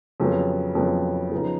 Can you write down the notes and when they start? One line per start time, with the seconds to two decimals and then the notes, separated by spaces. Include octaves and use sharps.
0.20 F2 C#3 F#3 B3
0.75 F2 C#3 F#3 B3
1.31 C#3 F3 B3 D#4